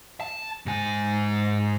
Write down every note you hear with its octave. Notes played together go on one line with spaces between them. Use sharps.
A5
G#2 G#5